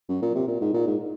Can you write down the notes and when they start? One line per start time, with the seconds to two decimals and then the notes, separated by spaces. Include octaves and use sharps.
0.09 F#2
0.22 A#2
0.35 C3
0.48 A#2
0.61 G#2
0.74 A#2
0.87 G#2